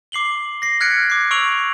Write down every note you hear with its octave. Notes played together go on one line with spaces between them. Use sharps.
D6 C7 F#7 G7
A#6 C7
F6 F#6 G#6 B6 C#7 D7
D6 C7
C#6 E6 D7 F7 F#7